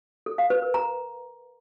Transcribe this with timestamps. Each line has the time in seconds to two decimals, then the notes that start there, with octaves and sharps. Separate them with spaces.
0.26 A4
0.38 F5
0.50 B4
0.62 A#4
0.74 A#5